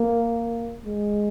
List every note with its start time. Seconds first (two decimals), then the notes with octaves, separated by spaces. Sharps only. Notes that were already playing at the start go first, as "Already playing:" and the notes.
Already playing: A#3
0.85 G#3